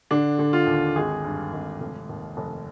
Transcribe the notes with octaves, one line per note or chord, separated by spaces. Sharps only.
D3 D4
D3
F4
D#2
G#1 G#4
G2
G#1
F1
D#2
F1